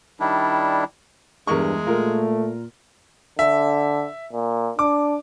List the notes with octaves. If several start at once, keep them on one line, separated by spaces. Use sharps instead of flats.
D#3 G3 D4 E4
E2 G2 G#3 A#4 C#6
A#2 A3 F4 A#4
D3 E5
A#2
D4 D6